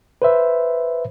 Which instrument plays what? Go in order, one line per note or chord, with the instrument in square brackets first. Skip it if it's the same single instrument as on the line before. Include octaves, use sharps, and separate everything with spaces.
[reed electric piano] B4 C5 E5